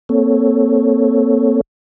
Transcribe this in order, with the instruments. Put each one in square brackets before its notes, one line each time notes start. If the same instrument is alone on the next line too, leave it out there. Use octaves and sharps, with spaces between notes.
[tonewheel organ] A#3 C4 A4 C#5